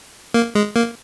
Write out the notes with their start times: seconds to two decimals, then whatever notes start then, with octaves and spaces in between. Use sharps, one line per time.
0.34 A#3
0.55 G#3
0.76 A#3